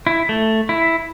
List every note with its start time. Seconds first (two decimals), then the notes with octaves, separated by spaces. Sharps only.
0.07 E4
0.29 A3
0.69 E4